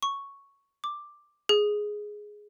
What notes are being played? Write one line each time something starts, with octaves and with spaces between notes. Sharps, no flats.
C#6
D6
G#4